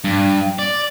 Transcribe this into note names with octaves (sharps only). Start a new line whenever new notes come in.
G2
D5